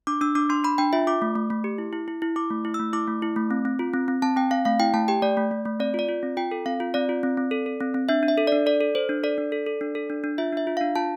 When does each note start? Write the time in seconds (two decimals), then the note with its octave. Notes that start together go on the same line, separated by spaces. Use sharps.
0.07 D4 D6
0.21 D4 E6
0.35 D4 D6
0.50 D4 C6
0.64 D4 B5
0.78 D4 G5
0.93 F4 E5
1.07 F4 D6
1.22 A3
1.36 A3
1.50 A3
1.64 G4
1.78 E4
1.93 E4
2.08 E4
2.22 E4
2.36 E4 D6
2.50 A3
2.65 E4
2.74 A3 E6
2.93 E4 D6
3.07 A3
3.22 E4
3.36 A3
3.51 C4
3.65 C4
3.79 F4
3.93 C4
4.08 C4
4.22 C4 A5
4.36 C4 G5
4.51 C4 F5
4.65 A3 F5
4.80 E4 G5
4.94 A3 A5
5.08 G4 G5
5.22 A3 D5
5.37 A3
5.51 A3
5.65 A3
5.80 C4 D5
5.94 F4 D5
6.08 F4
6.23 C4
6.37 F4 G5
6.51 A4
6.66 C4 F5
6.80 F4
6.94 C4 D5
7.09 F4
7.23 C4
7.37 C4
7.51 A4
7.66 A4
7.80 C4
7.94 C4
8.09 D4 E5
8.23 D4
8.28 E5
8.38 A4
8.47 D4 D5
8.66 A4 D5
8.81 A4
8.95 A4 C5
9.09 D4
9.23 A4 D5
9.38 D4
9.52 A4
9.66 A4
9.81 D4
9.95 A4
10.10 D4
10.24 D4
10.38 F4 E5
10.53 D4 E5
10.67 F4
10.77 D4 F5
10.95 F4 A5